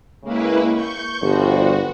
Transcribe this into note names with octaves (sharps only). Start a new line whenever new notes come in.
A2 C#3 G#3 A#3 E4 B4
C#6 G6
G1 F3 G3 F#4